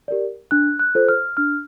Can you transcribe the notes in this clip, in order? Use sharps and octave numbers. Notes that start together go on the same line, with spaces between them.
G4 A#4 D5
D4 F#6
F#6
F4 A4 C5
F6
D4 F6